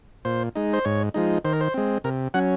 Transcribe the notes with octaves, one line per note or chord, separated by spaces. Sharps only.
A#2 C5
G#3 D#4
C5
G#2 C#5
F3 G#3 D#4
D#3 C5
A#4
C5
G#3 C4
C3 A#4
F#3 C#4 F#5